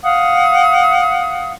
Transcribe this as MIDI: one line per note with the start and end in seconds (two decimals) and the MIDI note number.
0.03 1.53 77
0.03 1.53 78
0.03 1.53 87